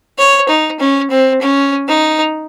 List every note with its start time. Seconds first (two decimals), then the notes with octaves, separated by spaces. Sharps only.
0.18 C#5
0.49 D#4
0.80 C#4
1.10 C4
1.41 C#4
1.88 D#4